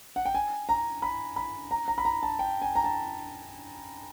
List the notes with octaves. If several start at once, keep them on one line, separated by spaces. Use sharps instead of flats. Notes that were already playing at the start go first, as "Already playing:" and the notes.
F#5
G5
G#5
A#5
B5
B5
A#5
A#5
B5
A#5
A5
G5
G#5
A#5
A5